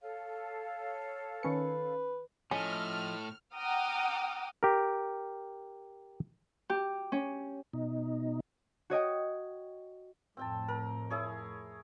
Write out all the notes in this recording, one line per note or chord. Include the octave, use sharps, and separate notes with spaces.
A4 C#5 F5
D#3 C#4 B4 C#7
A2 F3 C#4 D#5 F6
F#5 G5 A#5 D6 D#6 F6
G4 A#4
G4
C#4
B2 D#4
F#4 C#5 D#5 G5
F2 A2 C4 G5 A5
A#4
E4 G#4 C#5